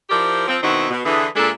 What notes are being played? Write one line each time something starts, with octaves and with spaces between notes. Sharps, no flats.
F3 E4 G4 A#4 C5 D5
F3 C4
B2 D#3 C4 D#4 E4 F#4
B2
D3 E3 G#4
A#2 G#3 D4 A4 E5